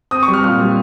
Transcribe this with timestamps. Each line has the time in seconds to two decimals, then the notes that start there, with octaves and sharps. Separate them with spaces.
0.11 C4 D#6
0.23 C#6
0.28 G3
0.34 F6
0.44 A#2 F6
0.60 G3